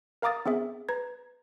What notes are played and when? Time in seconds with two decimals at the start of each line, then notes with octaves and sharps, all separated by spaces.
0.22 A#4 F5 A#5 D6 D#6 A6
0.46 B3 C4 G#4 E5
0.89 B4 A#5 G#6